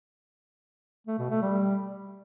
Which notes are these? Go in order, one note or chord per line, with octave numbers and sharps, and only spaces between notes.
A3
B2
A3
G3